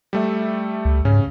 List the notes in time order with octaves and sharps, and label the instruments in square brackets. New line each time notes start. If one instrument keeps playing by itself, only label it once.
[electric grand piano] G3 A3 E5
[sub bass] C#2
[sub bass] G#2 [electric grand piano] C#3 C#4